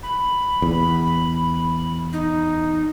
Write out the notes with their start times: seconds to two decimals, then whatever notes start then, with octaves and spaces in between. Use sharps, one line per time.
0.03 B5
0.62 E2
2.13 D#4